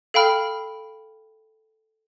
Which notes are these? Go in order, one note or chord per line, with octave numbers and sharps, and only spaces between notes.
A4 F5 G5 B5 F6